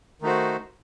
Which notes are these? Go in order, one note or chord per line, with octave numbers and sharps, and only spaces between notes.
D#3 A3 D#4 F#4 C5